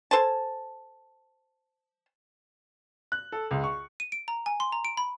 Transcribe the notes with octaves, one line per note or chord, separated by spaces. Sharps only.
A4 C5 G#5 A5
F#6
A4
C#2
C#6
D#7
D7
A#5
G#5
C6
A#5
D7
B5